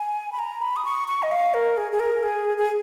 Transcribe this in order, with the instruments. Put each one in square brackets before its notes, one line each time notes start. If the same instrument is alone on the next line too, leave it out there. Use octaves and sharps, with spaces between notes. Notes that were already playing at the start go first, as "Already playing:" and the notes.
Already playing: [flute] G#5
B5
A#5
B5
D#6
C#6
C#6
D#5
F5
A#4
G#4
G#4
A#4
G#4
G#4